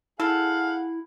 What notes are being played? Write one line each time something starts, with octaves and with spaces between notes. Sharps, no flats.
E4 G#4 A4 F5 F#5